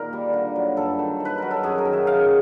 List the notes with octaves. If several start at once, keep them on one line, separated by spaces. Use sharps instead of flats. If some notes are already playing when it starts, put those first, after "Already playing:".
Already playing: A#2 D#3 A#4
G3
D3
F#3
G2 A4
D#3
D#3
B4
F#3 A#4
A4
F#2 G#4
A#4
D#3
E5
C#3 F5